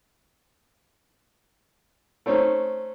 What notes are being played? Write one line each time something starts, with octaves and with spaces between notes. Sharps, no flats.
A3 C4 C#4 D#4